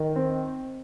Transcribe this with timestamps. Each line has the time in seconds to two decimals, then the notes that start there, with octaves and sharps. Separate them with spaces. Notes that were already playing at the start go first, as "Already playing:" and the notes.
Already playing: D#3
0.16 C4